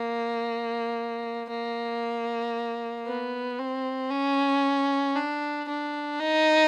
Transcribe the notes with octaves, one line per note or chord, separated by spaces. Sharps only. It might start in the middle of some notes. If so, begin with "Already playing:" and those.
Already playing: A#3
A#3
B3
C4
C#4
D4
D4
D#4